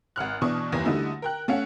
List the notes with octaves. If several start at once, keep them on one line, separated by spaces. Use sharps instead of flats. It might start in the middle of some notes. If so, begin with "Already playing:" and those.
G#1 F#5 F6 F#6
B2 E3 D4 C#6 D#6
F#1 D#2 E3 A#6
D3 G3 A3 D#4 E4 F#4
A#4 G5 F#6
A3 C#4 F5 F#5